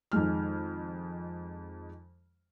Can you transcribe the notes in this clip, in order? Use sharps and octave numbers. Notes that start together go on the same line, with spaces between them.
F2 D#3 G#3 F6